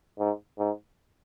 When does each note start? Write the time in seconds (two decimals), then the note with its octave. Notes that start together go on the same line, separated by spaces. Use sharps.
0.19 G#2
0.58 G#2